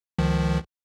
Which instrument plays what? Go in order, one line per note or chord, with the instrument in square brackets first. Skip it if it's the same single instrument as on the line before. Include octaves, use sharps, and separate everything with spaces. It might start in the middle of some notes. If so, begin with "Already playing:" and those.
[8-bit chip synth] C#2 D#3 F3